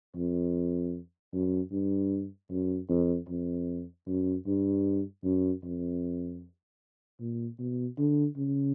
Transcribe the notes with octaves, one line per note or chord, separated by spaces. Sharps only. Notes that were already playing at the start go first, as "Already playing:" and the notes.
F2
F#2
G2
F#2
F2
F2
F#2
G2
F#2
F2
A#2
B2
D3
C#3